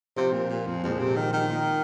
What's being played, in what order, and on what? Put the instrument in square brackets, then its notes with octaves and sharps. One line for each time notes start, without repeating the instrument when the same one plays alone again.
[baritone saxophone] C3 [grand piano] F3 C4 F4 C5
[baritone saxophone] A#2
A#2
F2
[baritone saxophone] F2 [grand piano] A#2 F3 G#3 C4
[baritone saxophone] C3
D#3
D#3
[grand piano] A#3 F4 A#4